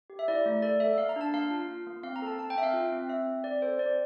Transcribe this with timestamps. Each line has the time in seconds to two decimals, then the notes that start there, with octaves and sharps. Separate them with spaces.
0.10 G4
0.19 E5
0.28 E4 D5
0.46 A3
0.62 A4 D5
0.80 A4 E5
0.98 A#3 F5
1.09 A#5
1.16 D4 A5
1.34 A#3 F5
1.50 F4
1.68 F4
1.87 A#3
2.03 C4 F5
2.16 A#5
2.22 A4 A5
2.39 C4 A5
2.50 G5
2.56 C4 E5
2.63 F5
2.74 F4
2.92 C4
3.09 C4 E5
3.27 C4
3.44 C4 D5
3.62 A4 C5
3.79 C4 D5